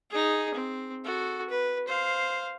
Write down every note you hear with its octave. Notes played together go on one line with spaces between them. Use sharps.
D#4 G#4
C4
F#4 A4
B4
C5 F5